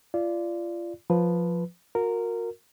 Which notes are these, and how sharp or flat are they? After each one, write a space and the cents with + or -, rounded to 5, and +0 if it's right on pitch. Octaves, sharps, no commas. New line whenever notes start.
F4 -30 D5 +0
F3 +5 B4 +0
F#4 -35 A#4 -10